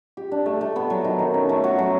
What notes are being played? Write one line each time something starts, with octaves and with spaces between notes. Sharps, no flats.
G4
D4
A3
A3
B3
F#3
D#3
D#3
C#4
A3
F#4
F#3